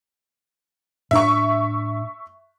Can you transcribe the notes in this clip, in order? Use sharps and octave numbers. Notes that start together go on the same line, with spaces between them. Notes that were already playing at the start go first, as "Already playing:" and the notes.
A2 D4 E5 C#6